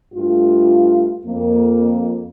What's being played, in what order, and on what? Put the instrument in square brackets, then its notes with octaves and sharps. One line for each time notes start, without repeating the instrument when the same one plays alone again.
[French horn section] G2 A3 F4
F2 A#3